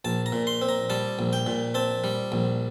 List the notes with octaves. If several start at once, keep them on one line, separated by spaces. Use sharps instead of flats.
A#1 A5
A#5
A#2
C6
C4
A#5
G3 A5
A#1
G5
A#2
C4 A5
G3
A#1